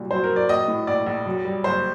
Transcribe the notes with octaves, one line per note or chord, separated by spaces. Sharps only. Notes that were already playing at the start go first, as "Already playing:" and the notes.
Already playing: C2 A#2 F#3
F#3 C5
A#4
F#3
D5
A#1 D#5
A2
A#1 D5
A#1
F#2
G3
F#1 C5